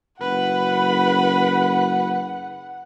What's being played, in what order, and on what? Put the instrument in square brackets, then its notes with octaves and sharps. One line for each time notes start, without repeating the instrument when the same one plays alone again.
[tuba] F#1 [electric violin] B4 B5 [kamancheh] F#5